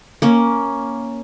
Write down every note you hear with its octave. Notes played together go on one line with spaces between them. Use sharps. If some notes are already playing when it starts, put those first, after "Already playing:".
A#3 C#4